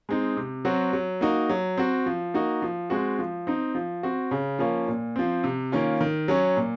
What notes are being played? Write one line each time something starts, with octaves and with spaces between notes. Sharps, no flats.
G#3 C4 D#4
C3
F#3 C4 F#4
F#3
A#3 D#4 F#4
F#3
C4 F#4
F3
A#3 D#4 F#4
F3
G#3 C4 F#4
F3
C4 D#4
F3
C4 F#4
C#3
F3 A#3 C#4
A#2
F3 C4
C3
D#3 A#3 C#4 F4
D#3
F#3 C#4
A#2